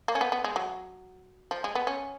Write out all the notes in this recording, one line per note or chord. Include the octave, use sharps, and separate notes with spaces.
A#3
C#4
B3
B3
G#3
F#3
F3
G#3
B3
C#4